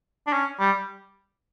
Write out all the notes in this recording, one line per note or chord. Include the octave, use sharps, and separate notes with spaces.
D4
C#4
G3